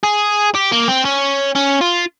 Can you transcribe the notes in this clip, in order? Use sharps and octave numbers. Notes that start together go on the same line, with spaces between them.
G#4
G4
A#3
C4
C#4
C#4
F4